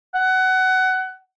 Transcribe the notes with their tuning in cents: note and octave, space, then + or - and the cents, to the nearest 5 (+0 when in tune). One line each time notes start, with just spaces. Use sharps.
F#5 +20